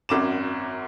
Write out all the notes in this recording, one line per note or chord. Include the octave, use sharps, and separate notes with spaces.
G#1 F#2 D6 E7